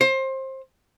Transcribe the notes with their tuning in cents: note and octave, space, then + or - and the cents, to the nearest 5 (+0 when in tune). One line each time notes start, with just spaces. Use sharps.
C5 +25